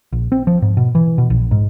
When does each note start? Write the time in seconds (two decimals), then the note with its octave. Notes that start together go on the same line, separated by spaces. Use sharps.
0.12 A#1
0.32 C4
0.47 F3
0.62 G#2
0.77 B2
0.95 E3
1.18 B2
1.30 A#1
1.51 G#2